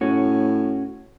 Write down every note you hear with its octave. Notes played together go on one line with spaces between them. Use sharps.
A2 C#4 F#4